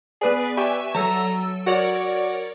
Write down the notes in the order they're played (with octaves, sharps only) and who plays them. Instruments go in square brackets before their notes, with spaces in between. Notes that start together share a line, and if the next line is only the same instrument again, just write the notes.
[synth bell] B3 B4 D5 [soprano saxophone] G#4
[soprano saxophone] G4 [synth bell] E5 G#5 C#6
[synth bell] F#3 A4 E6 [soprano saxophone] A#5
[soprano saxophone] F#4 [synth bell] A#4 C#5 D5